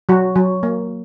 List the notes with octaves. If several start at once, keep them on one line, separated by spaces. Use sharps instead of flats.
F#3 F#4
F#3
A#3